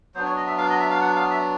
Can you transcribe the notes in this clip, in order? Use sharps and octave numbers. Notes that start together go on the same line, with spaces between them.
F#3 B3 D4 C5
C#5
D#5
E5
F5
D#5
E5
F5
F#5
F5
E5